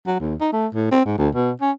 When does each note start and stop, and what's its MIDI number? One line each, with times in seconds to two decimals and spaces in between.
0.07 0.20 54
0.20 0.35 39
0.41 0.49 63
0.53 0.67 57
0.74 0.91 45
0.91 1.02 60
1.06 1.14 44
1.18 1.29 38
1.35 1.51 47
1.61 1.71 61